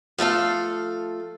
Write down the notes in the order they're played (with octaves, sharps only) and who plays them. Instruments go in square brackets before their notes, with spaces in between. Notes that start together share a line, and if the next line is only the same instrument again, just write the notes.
[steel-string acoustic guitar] F3 A3 A4 F5